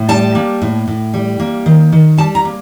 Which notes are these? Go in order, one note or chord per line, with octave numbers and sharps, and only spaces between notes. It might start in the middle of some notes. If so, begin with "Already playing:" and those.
Already playing: A2
G3 A5
A#3
A2
A2
G3
A#3
D#3
D#3
G3 A5
A#5
A#3